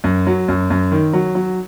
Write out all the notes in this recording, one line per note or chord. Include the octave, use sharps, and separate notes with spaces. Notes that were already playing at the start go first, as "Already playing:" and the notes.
F#2
F#3
F#2
F#2
D#3
F#3
F#3